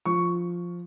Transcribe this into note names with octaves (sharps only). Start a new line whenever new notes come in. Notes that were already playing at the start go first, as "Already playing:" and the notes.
F3 C#6